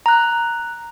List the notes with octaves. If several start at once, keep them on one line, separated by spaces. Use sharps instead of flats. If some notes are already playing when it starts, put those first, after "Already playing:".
A#5 F#6